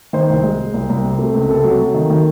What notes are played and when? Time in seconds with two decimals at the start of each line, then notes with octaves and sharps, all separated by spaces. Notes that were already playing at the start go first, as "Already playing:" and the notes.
0.13 D#3 C5
0.29 C2
0.43 G#3
0.58 G#3
0.74 C2
0.90 C2
1.04 C3
1.19 A3
1.35 C#2
1.50 C3 A4
1.64 F#3
1.79 F#3
1.94 D#3
2.10 D#3